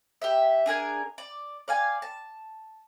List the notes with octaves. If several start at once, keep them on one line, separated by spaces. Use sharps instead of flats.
G4 E5
D4 G#4 A#4 G#5
D5
D5 F5 G#5
A5